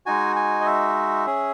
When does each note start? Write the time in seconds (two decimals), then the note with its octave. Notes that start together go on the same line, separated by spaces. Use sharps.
0.06 G#3 D#4 F#4 G#5
0.36 G#5
0.61 D#5
0.66 E5
1.26 C#4 G#4